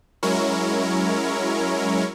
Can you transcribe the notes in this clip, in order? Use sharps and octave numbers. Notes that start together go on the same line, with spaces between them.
F#3 G#3 C#4 E4 A#4 C#5